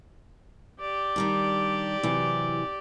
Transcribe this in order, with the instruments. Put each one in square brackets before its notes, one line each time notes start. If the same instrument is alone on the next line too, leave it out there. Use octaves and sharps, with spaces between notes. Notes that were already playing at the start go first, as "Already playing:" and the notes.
[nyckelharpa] G4 D5
[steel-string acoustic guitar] D#3 G3 D4
C3 E3 F#3